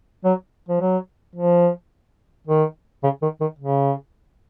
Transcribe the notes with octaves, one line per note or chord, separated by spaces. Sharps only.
F#3
F3
F#3
F3
D#3
C#3
D#3
D#3
C#3